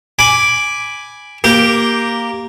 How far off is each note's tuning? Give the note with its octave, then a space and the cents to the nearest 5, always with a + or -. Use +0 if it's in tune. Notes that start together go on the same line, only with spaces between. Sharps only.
G#5 +0 B5 +0 D6 +0
A#3 +0 G4 +0